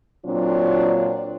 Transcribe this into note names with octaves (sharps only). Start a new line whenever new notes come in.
A#2 F#3 C4 D4 F4 C#5